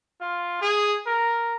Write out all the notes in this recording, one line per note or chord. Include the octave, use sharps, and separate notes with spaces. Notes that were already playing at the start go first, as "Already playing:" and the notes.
F4
G#4
A#4